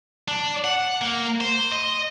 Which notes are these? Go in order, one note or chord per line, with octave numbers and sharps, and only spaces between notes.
D4
F#5
A#3
C5
D#5